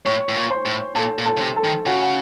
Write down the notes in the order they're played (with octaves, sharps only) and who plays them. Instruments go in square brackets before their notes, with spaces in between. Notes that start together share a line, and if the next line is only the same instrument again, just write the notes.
[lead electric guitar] A2 [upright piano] C#5 C#6
[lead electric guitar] A2
A#2
[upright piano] C5 C6
[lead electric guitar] A2
[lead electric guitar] A#2 [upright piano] A4 A5
[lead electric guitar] A#2
[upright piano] A4 A5
[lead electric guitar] C#3
C3
[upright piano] A4 A5
[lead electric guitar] D#3
[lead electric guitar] C#3 [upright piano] F#4 F#5
[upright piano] F#5